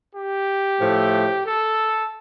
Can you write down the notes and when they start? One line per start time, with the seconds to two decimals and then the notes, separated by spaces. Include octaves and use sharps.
0.15 G4
0.80 A2 F3 A3
1.46 A4